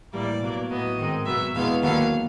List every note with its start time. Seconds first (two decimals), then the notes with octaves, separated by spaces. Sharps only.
0.13 A2 E3 G3 A#3 D5
0.41 B2 F#3 A#3
0.69 A2 F#3 B3 D#5
0.97 G#2 D#3 G#3 C4
1.26 B2 F#3 B3 E5
1.54 E2 B2 G#3 B3 F5
1.82 D#2 D3 F#3 B3 F5